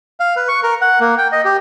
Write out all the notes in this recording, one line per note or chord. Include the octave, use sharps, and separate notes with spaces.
F5
B4
C#6
A#4
F#5
A#3
G5
D#5
G4